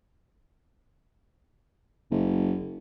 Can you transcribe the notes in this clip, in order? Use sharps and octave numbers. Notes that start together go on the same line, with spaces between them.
F#1